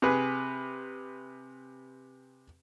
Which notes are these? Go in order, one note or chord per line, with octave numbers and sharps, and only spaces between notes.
C3 G#4 B4